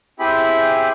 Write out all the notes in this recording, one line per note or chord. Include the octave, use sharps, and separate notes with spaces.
C4 E4 G4 G#4 B5